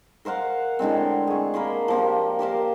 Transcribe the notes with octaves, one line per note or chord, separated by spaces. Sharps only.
A#4 C5 F5 F#5
A2 D3 G#3 C4
G#4 C#6
A#3 A#4 B5 C6
F3 A#3 G4
G4 A#4 C5 F5